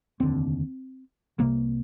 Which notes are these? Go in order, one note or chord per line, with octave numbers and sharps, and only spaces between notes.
F1 D#2 D3 C4
C2 C3 A#3